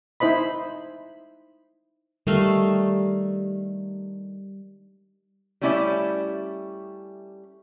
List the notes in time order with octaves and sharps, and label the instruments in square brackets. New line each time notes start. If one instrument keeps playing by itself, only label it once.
[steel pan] D#4 E4 C5 D#5 B5
[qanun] D#3 A3 F5 [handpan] G3
[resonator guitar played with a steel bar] G3 A3 C#4 E4 D5 E5